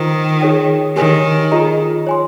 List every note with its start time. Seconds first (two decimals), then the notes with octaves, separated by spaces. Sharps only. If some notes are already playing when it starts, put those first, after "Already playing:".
Already playing: D#3 F4 C5 G5 A#5
0.41 D#4 G#4 C#5 G5
0.96 D#3 G4 A#4 C#5 G#5
1.52 F4 G#4 D#5 A#5
2.07 C#5 G#5 C6